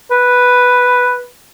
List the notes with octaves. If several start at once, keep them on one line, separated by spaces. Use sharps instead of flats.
B4